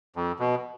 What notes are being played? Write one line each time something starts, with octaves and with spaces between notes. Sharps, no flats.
F2
B2